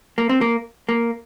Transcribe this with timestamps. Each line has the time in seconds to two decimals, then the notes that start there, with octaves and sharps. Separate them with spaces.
0.18 A#3
0.29 C4
0.41 A#3
0.89 A#3